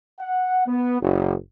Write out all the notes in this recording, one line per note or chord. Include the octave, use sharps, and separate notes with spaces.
F#5
B3
F#1